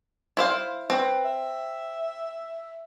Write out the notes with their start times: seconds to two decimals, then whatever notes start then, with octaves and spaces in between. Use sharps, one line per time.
0.37 E4 C5 F5
0.90 C4 B4
1.24 E5